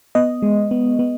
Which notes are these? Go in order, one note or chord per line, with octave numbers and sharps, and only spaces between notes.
B3 D#5
G#3
B3
B3